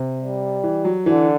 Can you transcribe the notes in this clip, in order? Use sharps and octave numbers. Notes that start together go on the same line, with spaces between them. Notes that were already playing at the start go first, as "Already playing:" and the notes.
Already playing: C3
G3
E3
F#3
D3 E3